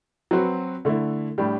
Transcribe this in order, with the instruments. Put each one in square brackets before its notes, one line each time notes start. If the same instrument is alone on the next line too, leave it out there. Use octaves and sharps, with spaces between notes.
[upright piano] F#3 C4 F#4 B4
D3 A3 E4
A2 G3 D4 G4